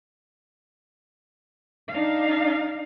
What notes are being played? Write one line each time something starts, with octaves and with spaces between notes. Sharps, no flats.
D4 D#4 F5